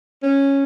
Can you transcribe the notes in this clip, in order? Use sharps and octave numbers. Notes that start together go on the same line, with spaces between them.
C#4